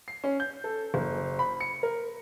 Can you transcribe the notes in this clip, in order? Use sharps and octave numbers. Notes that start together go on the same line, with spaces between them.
C7
C#4
G6
A4
F#1
B5
C#7
A#4